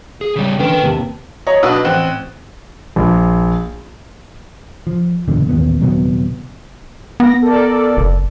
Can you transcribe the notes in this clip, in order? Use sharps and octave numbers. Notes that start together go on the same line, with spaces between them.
G#4
C#3 G3
D3 E3 C#4 A#4 G5
D#2 C3 A5
C#5 D#5 A#5
B1 B2 D4 D#4 B4 D#6
A1 C4 F#6 E7
A#1
F3
F#1 E2 A#2 D3
A1 D#2 A#2 B3
D#1 C3 F#3 B3
B3 A#6
A4 A#4 D5
F#1